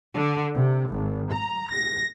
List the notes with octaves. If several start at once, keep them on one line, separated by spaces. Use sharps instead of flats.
D3
C3
G#1
A#5
A#6